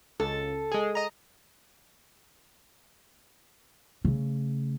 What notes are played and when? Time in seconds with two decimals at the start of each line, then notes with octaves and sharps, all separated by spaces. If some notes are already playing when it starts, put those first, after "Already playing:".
0.20 C#2 A4
0.72 G#3 G#4
0.95 D#5 A#5
4.05 C#3 A3